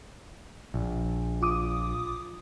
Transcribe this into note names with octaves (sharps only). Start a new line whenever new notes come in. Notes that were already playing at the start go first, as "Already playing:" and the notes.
A#1
F4 D6 D#6